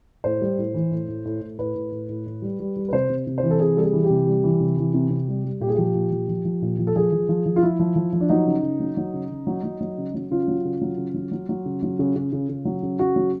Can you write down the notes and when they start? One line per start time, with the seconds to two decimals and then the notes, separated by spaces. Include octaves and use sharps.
0.24 A2 C5
0.41 G3
0.58 A2
0.74 E3
0.91 A2
1.08 A2
1.25 A2
1.41 A2
1.58 A2 B4
1.75 A2
1.92 A2
2.09 A2
2.26 A2
2.42 G3
2.60 G3
2.76 G3
2.88 B4
2.92 C3 C5
3.09 C3
3.27 C3
3.38 C5
3.43 E3
3.50 A4
3.60 C3 G#4
3.77 G3 A4
3.82 G#4
3.93 E3
4.04 G4
4.10 C3
4.27 G3
4.44 E3
4.60 C3
4.78 E3
4.94 C3
5.10 C3
5.28 G3
5.45 G3
5.60 A#2 G4
5.68 G#4
5.75 F3 G4
5.95 A#2
6.12 F3
6.28 F3
6.45 F3
6.62 A#2
6.79 F3
6.87 A4
6.95 F3 G#4
7.12 F3
7.29 F3
7.46 F3
7.56 F4
7.63 F3 E4
7.79 F3
7.96 F3
8.13 F3
8.20 D4
8.29 F#3 D#4
8.46 C#3
8.63 C#3
8.80 F#3
8.97 F#3
9.14 C#3
9.30 C#3
9.47 F#3
9.64 F#3
9.81 F#3
9.98 C#3
10.14 F#3
10.31 C#3 F4
10.48 F#3
10.65 C#3
10.81 F#3
10.98 C#3
11.14 F#3
11.31 F#3
11.49 F#3
11.65 C#3
11.83 F#3
11.99 C#3
12.16 C#3
12.32 C#3
12.49 C#3
12.65 F#3
12.83 C#3
12.99 C#3 F#4
13.16 F#3